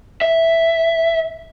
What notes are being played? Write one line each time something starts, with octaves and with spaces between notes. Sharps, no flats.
E5